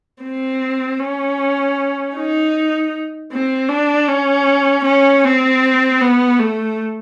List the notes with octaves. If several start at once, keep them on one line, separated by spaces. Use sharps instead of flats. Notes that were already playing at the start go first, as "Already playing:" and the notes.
C4
C#4
D#4
C4
D4
C#4
C#4
C4
B3
A3